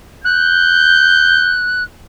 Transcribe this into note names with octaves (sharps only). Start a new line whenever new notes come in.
F#6 G6